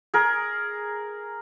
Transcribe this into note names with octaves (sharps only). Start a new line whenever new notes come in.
G#4 A#4